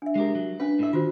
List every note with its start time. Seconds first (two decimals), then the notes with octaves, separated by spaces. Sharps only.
0.02 D4 E5
0.15 G#3 G4 A#4
0.35 F#3
0.60 C#4 D4 B4
0.79 A2 E5
0.93 D#3 F4 F#4 C5